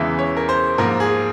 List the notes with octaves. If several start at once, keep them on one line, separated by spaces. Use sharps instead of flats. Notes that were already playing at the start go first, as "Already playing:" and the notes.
Already playing: E2 C#3 E3 G#3 E5
C#5
A#4
C5
G#2 F3 A#3 A#4
G#4